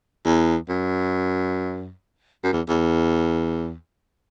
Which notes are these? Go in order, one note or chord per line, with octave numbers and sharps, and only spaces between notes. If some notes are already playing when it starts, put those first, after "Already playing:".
E2
F#2
F#2
E2
E2